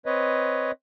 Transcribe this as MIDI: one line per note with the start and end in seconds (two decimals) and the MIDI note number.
0.06 0.71 60
0.06 0.71 71
0.06 0.71 73
0.06 0.71 75